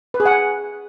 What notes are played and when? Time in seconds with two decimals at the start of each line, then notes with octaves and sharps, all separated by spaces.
0.14 B4
0.20 G#4
0.26 F#5
0.31 G#5